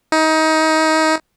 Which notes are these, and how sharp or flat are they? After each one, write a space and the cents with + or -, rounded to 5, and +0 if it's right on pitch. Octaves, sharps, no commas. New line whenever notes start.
D#4 +25